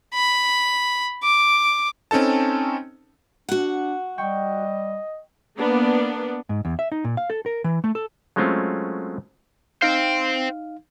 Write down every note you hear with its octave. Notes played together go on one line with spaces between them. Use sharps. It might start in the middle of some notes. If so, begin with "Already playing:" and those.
B5
D6
C4 C#4 D#4 A4 A5
D4 F#4 F#5
G3 D#5 G5 C#6
A#3 B3 D4
G#2
E2
E5
D#4
A#2
F5
A4
A#4
E3
A3
A4
F#3 G#3 A3 C4 C#4 F4
D#4 C5 F5 G5